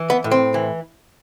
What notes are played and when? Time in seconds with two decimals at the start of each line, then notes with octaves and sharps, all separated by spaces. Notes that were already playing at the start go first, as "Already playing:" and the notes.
Already playing: E3
0.10 B3
0.24 A2
0.31 C4
0.54 E3